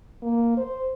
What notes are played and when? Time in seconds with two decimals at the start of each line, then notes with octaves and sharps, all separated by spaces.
0.23 A#3
0.57 C5